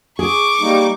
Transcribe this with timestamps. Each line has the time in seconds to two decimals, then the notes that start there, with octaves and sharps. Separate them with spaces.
0.19 G#4 C#6 D6
0.61 G3 A#3 D#4